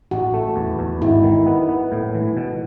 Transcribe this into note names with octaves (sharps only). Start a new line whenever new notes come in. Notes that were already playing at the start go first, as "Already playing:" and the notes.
A1 F#4
A3
E2
E2
G#1 E4
D#3
B3
B3
A2
E3
B2